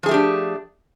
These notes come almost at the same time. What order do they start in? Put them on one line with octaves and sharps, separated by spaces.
F3 G#4 A3 G4 D4